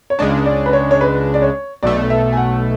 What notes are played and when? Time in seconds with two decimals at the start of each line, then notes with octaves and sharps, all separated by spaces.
0.10 C#5
0.19 C#2 C#3 G#3 D4 D5
0.46 D5
0.66 B4
0.73 C#5
0.91 C#5
1.01 B4
1.34 D5
1.42 C#5
1.83 B1 B2 A3 D5
2.10 E5
2.33 G#5
2.37 F#5